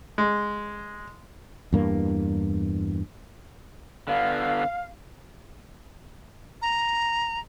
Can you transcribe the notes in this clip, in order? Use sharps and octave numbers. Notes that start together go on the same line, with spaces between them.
G#3
E2 G2 A#3
D3 B3 F5
A#5